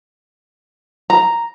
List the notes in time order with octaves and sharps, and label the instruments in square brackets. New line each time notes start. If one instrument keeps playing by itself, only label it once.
[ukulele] A#5